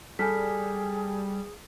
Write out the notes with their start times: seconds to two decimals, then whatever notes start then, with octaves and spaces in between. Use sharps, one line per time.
0.19 G3 G#4 A4 G#5 F6 B6